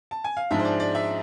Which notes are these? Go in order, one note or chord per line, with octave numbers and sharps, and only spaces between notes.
A5
G#5
F5
G#2 F3 G#3 D4 E5
C5
D5
D5
E5